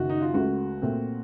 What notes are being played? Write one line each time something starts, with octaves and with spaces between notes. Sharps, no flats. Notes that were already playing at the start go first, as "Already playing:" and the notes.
Already playing: F#1 F#2 D#3 F#4
D#4
F4
C#2 C#3 A3 F#4
A#2 A3 C4